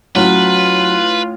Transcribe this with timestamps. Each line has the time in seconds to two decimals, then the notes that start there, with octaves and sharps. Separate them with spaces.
0.15 A2 F#3 C#4 F4 B4